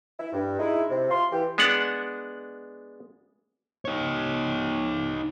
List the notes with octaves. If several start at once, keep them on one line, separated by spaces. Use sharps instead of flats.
E4
G2
G#3 D#4 E4
C3
F4 C6
E3 G4
G#3 B3 D4 F#5
D#4 C#5